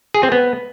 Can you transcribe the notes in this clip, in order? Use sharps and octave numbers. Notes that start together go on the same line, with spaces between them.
G#4
C4
B3